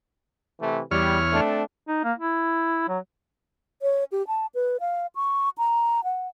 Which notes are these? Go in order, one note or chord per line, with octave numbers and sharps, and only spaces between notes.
C3 E3 A3
E2 G3 C#5 F6
A3 C4 D4
D#4
A#3
E4
F#3
C#5
G4
A5
B4
F5
C#6
A#5
F#5